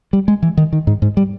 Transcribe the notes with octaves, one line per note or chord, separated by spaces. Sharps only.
G3
G#3
E3
D#3
D#3
G#2
G#2
G3